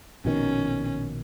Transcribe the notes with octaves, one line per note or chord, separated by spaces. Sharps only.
A#1 B2 D#3 C#4